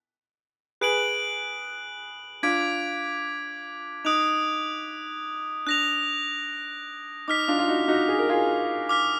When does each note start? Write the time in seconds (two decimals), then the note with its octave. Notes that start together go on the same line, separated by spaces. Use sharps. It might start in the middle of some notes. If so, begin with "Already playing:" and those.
0.81 G#4 B4 F#6 D7 F#7
2.43 D4 F4 D6 G#6 B6 D7
4.04 D#4 D#6 F#6 D7 F7
5.66 D4 F#6 A#6 F7
7.28 D#4 D6 F6 B6
7.48 D4 F4
7.59 F4
7.68 D#4 F#4
7.88 D#4 F#4
8.08 G#4
8.19 A#4
8.29 F4 G#4
8.89 D6 F6 B6